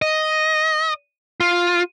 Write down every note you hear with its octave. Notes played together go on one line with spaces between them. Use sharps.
D#5
F4